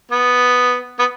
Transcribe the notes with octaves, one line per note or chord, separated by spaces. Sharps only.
B3
B3